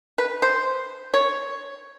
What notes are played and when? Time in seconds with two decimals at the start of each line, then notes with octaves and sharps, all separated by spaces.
0.18 B4
0.42 C5
1.14 C#5